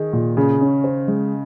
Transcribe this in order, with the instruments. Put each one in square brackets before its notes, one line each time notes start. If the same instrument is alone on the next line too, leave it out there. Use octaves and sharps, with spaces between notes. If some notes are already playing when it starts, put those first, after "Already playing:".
Already playing: [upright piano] D#3 [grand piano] G#4
[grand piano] A#2
[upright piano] C#3 [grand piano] G#4
[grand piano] C#4
C5
G#3